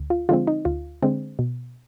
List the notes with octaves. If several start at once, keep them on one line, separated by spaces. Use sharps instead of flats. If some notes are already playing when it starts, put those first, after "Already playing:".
Already playing: D2
F4
D3 F3 G#3 C4 F4
D#4
D2 F4
D3 G#3 C4
B2